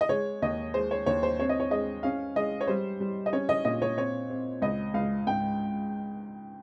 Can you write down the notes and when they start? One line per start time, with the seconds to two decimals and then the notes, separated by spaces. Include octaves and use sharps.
0.01 D#5
0.09 G#3 C#5
0.42 D#2 D#5
0.74 G#3 C5
0.91 C#5
1.06 D#2 C#5
1.23 C5
1.39 C4 C#5
1.49 D#5
1.60 C#5
1.71 G#3 D#5
2.03 C#4 F5
2.36 G#3 D#5
2.61 C#5
2.68 G3 C5
3.00 G3
3.26 D#5
3.33 C#4 C#5
3.49 D#5
3.65 A#2 D#5
3.82 C#5
3.97 C4 C#5
4.30 C4
4.62 C#2 D#5
4.94 C#2 F5
5.27 G#2 G5